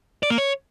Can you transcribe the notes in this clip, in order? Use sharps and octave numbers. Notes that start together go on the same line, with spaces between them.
D5
A#3
C#5